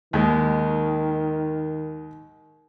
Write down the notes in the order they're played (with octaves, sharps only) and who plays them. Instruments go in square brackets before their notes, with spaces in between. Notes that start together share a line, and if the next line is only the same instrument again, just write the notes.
[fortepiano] D#2 G#3 [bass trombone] D#3